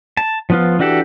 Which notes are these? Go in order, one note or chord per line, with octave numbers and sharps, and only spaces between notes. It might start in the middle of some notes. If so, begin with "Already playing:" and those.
A5
F3 B3 F4
E3 D4 F#4 G4 A4